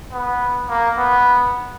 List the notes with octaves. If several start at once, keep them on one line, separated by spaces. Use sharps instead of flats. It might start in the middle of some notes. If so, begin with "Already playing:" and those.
B3
A#3
B3